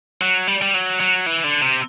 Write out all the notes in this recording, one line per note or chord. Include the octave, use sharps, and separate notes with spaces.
F#3
G3
G3
F#3
F#3
E3
D3
C3